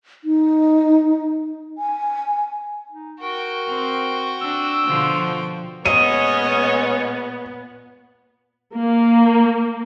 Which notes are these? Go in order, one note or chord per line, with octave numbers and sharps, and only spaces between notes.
D#4
G#5
D#4
F#4 A#4 G5
C4
D4 E6
B2 D3 F3
A#2 G#3 B3 C#4 C#5 D#5 D#7
A#3